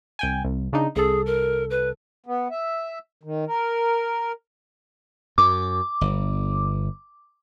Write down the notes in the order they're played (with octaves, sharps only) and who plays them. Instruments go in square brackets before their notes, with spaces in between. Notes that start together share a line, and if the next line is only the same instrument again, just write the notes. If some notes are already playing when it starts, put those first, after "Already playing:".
[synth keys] C2 G5 G#5
C2
C#3 D4 D#4
[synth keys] C2 A4 [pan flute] G#4
[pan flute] A#4
B4
[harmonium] B3
E5
D#3
A#4
[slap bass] F#2 [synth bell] D6
[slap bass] G1